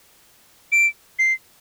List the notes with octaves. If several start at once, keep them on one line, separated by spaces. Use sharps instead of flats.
D7
C7